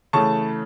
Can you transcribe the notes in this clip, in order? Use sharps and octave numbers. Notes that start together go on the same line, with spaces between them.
C#3 E3 A3 A5 C#6